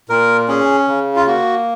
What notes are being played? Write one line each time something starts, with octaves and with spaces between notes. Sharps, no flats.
A#2 A#4
C#4 G#4
C#3
F4
A#3 F#4